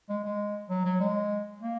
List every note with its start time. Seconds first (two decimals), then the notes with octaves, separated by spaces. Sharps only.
0.09 G#3
0.24 G#3
0.70 F#3
0.85 F#3
1.00 G#3
1.60 A#3